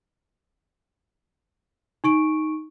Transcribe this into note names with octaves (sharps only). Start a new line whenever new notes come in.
D#4 C#6 D7